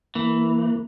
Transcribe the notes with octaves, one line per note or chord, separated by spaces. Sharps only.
E3 A#3